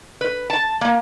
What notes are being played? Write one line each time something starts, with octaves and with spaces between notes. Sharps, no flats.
B4
A5
A#3